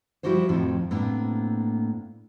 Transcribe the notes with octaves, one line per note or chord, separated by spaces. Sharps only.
F3 G3 E4 F#4 G4 C5
F2 A2 C3 D#3 F3
A2 C3 A#3 B3 D4